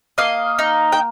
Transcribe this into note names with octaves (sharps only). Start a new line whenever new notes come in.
A#3 D#5 F5
D#4
G5